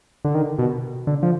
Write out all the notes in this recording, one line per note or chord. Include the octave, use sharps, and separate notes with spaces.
D3
D#3
B2
D3
F3